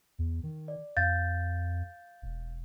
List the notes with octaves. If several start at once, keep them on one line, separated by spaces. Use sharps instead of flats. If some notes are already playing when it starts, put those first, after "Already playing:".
E2
D#3
D5
F2 F5 G6 A6
E1